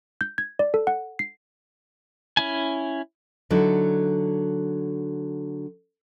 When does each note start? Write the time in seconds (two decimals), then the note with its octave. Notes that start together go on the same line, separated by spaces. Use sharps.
0.21 G6
0.38 G#6
0.59 D5
0.74 A4
0.87 F#5
1.19 C7
2.37 C#4 E4 G#5
3.50 D3 F#3 D#4 E4